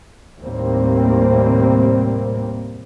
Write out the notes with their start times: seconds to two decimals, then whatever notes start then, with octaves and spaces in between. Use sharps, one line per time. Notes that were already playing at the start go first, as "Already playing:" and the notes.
0.40 D#2 A2 C3 G3 A#3 C4